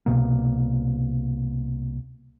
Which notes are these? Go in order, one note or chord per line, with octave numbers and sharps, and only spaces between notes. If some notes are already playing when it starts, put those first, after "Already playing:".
C2 B2 A#3